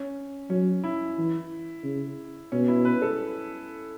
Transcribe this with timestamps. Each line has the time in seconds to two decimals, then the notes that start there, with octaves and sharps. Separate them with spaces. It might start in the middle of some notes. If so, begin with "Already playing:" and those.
Already playing: C#4
0.50 F#3 C#4
0.84 E4
1.18 E3
1.84 C#3
2.52 B2 C#4
2.68 E4
2.85 B4
3.02 A4